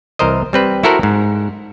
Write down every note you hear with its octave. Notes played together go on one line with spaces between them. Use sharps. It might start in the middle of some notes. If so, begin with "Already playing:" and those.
C2 E3 A#4 C5 D#5
G3 C4 B4
E4 F#4 A4 A#4 C5 F#5
G#2